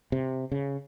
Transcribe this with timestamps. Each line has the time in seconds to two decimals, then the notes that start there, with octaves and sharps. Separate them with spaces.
0.12 C3
0.52 C#3